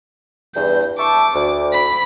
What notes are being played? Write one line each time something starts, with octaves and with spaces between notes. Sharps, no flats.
E2 G2 G6
E5 A5 C#6 D6
D2
B5